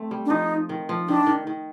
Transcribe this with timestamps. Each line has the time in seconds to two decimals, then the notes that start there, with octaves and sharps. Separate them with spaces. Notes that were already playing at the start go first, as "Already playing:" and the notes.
Already playing: A3 C4
0.11 G3
0.26 D4
0.30 F3 D#4
0.69 D#3
0.89 F3
1.08 D#3 D4
1.27 D#3
1.47 D#3